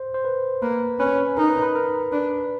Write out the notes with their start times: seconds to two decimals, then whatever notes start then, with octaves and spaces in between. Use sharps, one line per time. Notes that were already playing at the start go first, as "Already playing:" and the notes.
Already playing: C5
0.14 C5
0.25 B4
0.62 A#3 B4
0.99 C#4 B4
1.37 D#4 A#4
1.49 B4
1.63 B4
1.75 A#4
2.12 D4 B4